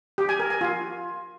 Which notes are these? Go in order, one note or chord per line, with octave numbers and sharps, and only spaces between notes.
G4
G#5
A#4
G#5
F4